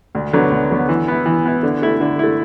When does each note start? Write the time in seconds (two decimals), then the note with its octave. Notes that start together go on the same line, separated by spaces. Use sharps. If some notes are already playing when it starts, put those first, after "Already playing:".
0.15 D2
0.33 D3 F#3 B3
0.51 D2
0.71 D3 F#3 B3
0.89 E3
1.08 B3 E4
1.26 E3
1.45 B3 E4
1.63 D3
1.82 A3 E4
2.00 D3
2.19 A3 E4